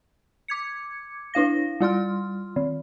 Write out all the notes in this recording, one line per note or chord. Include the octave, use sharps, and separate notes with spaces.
D6 G#6 C#7
D4 E4 F5 A#6
G3 F4 C6 F6
D#3